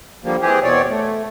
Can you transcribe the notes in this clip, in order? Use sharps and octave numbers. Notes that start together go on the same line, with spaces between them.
D3 F3 G3 A#3
E3 C4 G4 G#4
E2 B2 C4 C#5 D5
A3